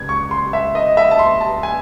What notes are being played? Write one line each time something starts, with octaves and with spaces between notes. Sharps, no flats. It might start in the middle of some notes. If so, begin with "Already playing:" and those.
Already playing: C#2 G#6
C#6
C6
E5
D#5
E5
A5
C6
A5
G#5